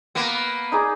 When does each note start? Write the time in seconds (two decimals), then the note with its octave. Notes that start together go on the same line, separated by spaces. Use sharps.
0.15 A#3 B3
0.72 D#4 G#4 D5